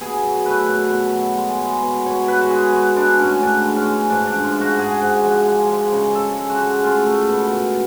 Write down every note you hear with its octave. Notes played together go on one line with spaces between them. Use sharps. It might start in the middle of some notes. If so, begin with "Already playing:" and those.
B2 G#4
F#3
A3 B4
B2
B2
F#3
G#3
G#3
B2
B2 C#5
G#3 B4
F#4
G#3 G#4
G#3 F#4
G#3 D4
A2 C#4
A2 D4
G#3
C#4
G#3
G#2 D4
D4
F3
F4
G#3
F#4
G#2 G#4
G#2
F3
G#3
G#3
C#3
C#3 A4
G#3
F#4
G#3
A3 F4
A3
B2
B2